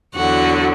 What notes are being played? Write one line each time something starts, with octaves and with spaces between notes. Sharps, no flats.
E2 D3 F#3 F#4